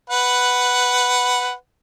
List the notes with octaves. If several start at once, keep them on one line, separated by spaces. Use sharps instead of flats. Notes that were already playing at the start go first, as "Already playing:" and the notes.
B4 F#5